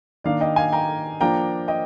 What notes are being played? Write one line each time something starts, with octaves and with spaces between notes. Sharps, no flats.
D#3 A#3 D4 D5 F5
D#5 G5
F5 G#5
G5 A#5
F3 A#3 D4 G5 A#5
D#5 G5